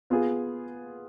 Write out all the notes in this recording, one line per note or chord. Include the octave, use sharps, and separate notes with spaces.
B3 F4 G#4